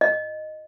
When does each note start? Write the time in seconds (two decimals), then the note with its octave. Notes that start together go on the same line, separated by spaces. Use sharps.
0.01 D#5